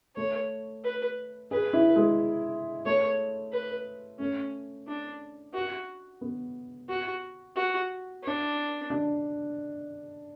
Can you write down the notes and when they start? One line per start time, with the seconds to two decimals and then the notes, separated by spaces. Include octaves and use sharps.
0.16 A3 C#5
0.84 B4
1.51 G#4 B4
1.73 E4
1.96 G#3
2.86 A3 C#5
3.53 B4
4.19 A3 C#4
4.87 D4
5.54 F#4
6.21 B3
6.89 F#4
7.56 F#4
8.23 D4
8.90 D4